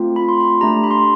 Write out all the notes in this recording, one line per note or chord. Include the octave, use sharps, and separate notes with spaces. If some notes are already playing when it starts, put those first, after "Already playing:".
Already playing: A3 C4 F4
B5
C6
B5
A3 D4 G4 A#5
B5
C6
B5